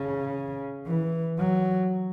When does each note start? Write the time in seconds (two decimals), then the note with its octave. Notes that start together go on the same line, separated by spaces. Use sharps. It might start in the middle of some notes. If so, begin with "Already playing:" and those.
Already playing: C#3
0.87 E3
1.38 F#3